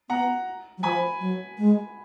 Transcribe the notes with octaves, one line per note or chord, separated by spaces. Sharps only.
B3 F#5 A#5
F#3
F3 G#5 B5
F#3
G#3